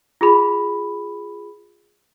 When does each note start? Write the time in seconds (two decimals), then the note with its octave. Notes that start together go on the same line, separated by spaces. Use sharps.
0.21 F4 G#4 B5